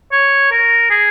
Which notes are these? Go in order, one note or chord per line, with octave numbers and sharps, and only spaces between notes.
C#5
A#4
G#4